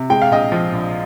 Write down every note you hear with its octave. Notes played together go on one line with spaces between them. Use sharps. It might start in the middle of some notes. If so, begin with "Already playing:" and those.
Already playing: C3
G#3 G5
F5
A#1 D#5 G5
F3
A#1